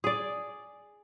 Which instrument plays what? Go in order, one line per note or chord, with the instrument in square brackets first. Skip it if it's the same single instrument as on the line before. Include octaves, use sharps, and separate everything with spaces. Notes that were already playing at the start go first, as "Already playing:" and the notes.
[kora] G#4 D5